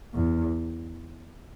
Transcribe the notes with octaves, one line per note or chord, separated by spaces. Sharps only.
E2